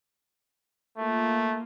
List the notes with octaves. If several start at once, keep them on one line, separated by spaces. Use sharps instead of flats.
A3 A#3 F4